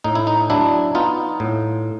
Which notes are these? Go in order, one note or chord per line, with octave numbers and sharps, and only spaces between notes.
A2 D#4
E4
D#4
F#3 D4 E4
B3 D#4 F4
A2